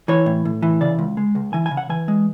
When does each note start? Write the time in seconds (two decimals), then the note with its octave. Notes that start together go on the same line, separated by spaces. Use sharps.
0.08 E3 C#5
0.26 A2
0.45 A2
0.63 E3
0.81 C#3 D5
0.99 C#2
1.17 G#3
1.35 C#2
1.53 E3 G#5
1.66 G#5
1.71 C#3
1.77 F#5
1.89 E3 G#5
2.08 G#3